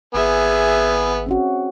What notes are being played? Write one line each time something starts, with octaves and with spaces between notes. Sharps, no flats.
G#1 B3 G#4 E5 G#5
C4 C#4 F#4